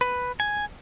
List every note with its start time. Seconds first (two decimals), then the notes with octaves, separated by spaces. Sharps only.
0.01 B4
0.40 G#5